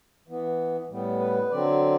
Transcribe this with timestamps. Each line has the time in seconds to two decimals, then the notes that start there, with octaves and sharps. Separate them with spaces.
0.28 E3 B3
0.89 A2 G3 B3
1.20 B4
1.50 D3 F#3 C4 D5